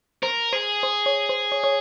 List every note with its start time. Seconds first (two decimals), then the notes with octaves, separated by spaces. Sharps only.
0.23 A#4 C5
0.53 G#4 C5
0.83 C5
1.06 C#5
1.29 C5
1.52 C#5
1.64 C#5